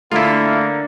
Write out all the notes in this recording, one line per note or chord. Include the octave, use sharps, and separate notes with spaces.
D3 A3 A#3 E4 F4